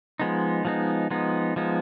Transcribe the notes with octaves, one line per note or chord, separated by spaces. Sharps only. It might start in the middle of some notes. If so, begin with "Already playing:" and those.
F3 G#3 B3 D#4
F3 G#3 B3 D#4
F3 G#3 B3 D#4
F3 G#3 B3 D#4